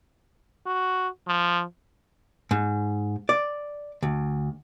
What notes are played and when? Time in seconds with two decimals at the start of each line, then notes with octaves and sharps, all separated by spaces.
0.67 F#4
1.28 F3
2.51 G#2
3.29 D5
4.03 D2